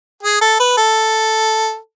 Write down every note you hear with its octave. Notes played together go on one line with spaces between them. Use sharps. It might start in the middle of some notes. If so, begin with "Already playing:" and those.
G#4
A4
B4
A4